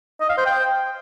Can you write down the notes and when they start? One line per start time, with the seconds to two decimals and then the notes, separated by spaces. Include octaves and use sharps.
0.21 D#5
0.29 F5
0.38 C5
0.46 G5